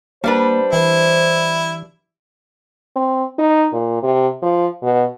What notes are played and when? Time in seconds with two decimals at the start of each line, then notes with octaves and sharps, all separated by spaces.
0.24 G3 A#3 D4 B4 C5
0.73 E3 E4
2.96 C4
3.38 D#4
3.73 A#2
4.03 C3
4.42 F3
4.83 B2